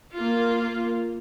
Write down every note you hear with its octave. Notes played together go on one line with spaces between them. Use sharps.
A#3 F4